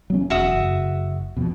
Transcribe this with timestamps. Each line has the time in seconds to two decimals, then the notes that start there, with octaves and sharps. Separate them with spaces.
0.10 F#3 B3 C#4
0.30 E1 F#4 E5 D#6
0.55 F#1
1.37 F2 B2